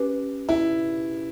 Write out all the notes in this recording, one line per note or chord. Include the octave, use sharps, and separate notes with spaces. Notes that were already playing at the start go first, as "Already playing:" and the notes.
Already playing: C#4 G4 B4
E4